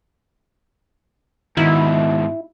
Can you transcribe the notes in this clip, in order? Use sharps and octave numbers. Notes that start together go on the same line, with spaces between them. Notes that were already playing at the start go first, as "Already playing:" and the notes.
G#2 B2 D#3 E4